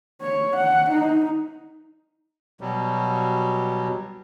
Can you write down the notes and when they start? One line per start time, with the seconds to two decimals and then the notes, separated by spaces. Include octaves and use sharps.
0.22 C#5
0.56 F#5
0.91 D#4
2.61 B2 F#3 G3